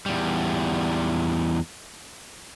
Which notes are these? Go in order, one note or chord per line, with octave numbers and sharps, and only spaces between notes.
E2 G3